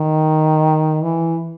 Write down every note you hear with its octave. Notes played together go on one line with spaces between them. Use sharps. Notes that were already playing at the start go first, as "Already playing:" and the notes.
Already playing: D#3
E3